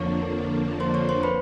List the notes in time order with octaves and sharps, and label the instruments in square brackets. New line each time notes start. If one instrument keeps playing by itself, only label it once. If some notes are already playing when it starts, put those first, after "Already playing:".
Already playing: [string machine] F2 D3 F3 A#3 D4 [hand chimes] C#5 C#6
[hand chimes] C5 C6
C#5 C#6
C5 C6
B4 B5